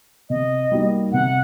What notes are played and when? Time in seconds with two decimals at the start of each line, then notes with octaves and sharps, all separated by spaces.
0.30 C3 D#5
0.72 G3 A#3 D#4 F#4
1.12 C3 F#5